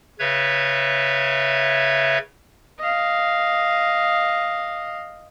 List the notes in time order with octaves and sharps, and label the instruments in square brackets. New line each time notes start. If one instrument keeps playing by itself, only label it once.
[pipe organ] C#3 B4 C#5 E5 G#6
[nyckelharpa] D#5 F5